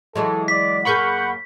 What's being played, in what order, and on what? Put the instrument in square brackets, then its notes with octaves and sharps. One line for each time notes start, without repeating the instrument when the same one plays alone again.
[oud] E3 F#3 G#3 [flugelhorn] A4
[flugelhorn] D5 [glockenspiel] B6
[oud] F#2 A#3 G#4 [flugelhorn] F#5 [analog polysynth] B5 C#6 G6